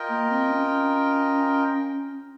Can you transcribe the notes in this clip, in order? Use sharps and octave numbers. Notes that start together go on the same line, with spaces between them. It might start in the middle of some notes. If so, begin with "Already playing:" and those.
Already playing: F4 A#4 D#5 G5
A#3
C4
C#4
C#4